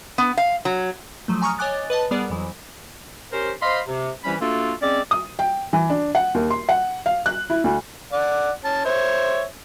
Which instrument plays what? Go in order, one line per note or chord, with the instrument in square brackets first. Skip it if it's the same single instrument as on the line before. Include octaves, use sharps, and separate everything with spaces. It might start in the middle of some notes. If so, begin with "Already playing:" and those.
[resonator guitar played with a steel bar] B3
F5
F#3
[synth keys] F3 F#3 A3
G#5 A#5 C#6 D#6 F6
C#5 D#5 G#5 D6 F#6 A6
B4 D#5 A5
G3 B3 G#4 A#4 D5 F#5
F2 E3 F#3
[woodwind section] C#4 G4 A#4 C5
C5 D#5 F5 B5 C6
C3
C3 E3 G3 C#4 E4 B5
A3 A#3 D4 F4 F#4 A4
G#3 C4 C#4 D5
[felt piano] D#6
G5
E3
D4
F#5
D#2
C6
F#5
F5
F#6
E4
D2
[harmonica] D5 F#5
C#4 A5
C5 C#5 E5